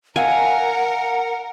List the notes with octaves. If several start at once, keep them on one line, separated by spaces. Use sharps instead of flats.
A#4 D#5 F5 F#5 G#5